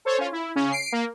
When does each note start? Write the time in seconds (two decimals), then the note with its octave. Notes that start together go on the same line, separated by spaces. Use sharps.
0.05 A4 C5 C#5
0.18 C#4 F4
0.32 E4
0.56 C#3 C#4
0.72 C7 D7
0.92 A#3